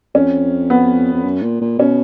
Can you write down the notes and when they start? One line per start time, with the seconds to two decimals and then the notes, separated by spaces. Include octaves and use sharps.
0.15 F2 C#4
0.70 B3
1.14 F2
1.25 F#2
1.42 A#2
1.61 A#2
1.78 B2 C#4